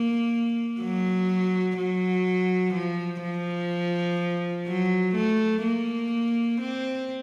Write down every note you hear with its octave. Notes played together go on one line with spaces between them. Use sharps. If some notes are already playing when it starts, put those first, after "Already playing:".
Already playing: A#3
F#3
F#3
F3
F3
F#3
A3
A#3
C4